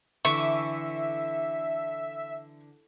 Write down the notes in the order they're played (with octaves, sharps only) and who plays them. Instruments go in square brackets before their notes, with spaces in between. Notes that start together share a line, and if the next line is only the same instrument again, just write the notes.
[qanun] D3 E3 D4 [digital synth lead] E5 [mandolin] C#6